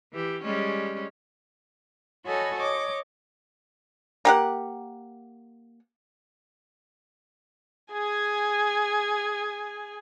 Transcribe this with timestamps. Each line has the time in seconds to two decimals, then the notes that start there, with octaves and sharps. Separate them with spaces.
0.13 E3 G4
0.43 G3 G#3 C#4
2.26 F#4 A4 C#5 D#5 G#5 B5
2.58 C#5 D#5 D6
4.25 A#3 G4 F#5
7.93 G#4 G#5